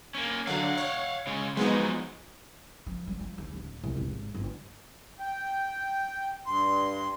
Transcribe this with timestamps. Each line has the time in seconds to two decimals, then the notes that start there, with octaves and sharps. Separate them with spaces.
0.15 A#3 C#4
0.47 D3 F#3 F5 F#5
0.78 C#5
1.27 C#3 G#3
1.57 F3 F#3 G#3 B3 D#4
2.87 F3
3.07 G3
3.20 F3
3.38 D#2
3.52 D1
3.84 C2
3.96 F1
4.11 G#1
4.35 G1
5.19 G5
6.46 G2 C6